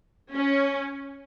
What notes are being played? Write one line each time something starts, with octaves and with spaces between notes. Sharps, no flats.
C#4